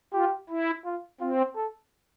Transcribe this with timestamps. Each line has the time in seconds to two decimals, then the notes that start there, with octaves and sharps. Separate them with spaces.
0.13 F4 G4
0.50 E4
0.85 F4
1.21 C4 F4
1.56 A4